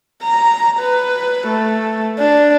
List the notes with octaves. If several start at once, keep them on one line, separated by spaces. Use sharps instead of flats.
A#5
B4
A3
D4